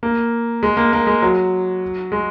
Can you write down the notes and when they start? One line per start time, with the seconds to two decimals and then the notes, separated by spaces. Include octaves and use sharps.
0.03 A#3
0.63 G#3
0.77 A#3
0.93 A#3
1.07 G#3
1.22 F#3
2.12 G#3